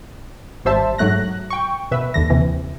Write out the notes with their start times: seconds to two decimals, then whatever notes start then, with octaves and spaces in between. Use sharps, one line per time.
0.65 G#1 G3 C5 E5 A5
0.98 G#2 F#3 A3 F#6 A#6
1.50 G5 C#6
1.91 B2 B4 E5
2.14 D#2 D3 A#6
2.30 D#2 C3 E3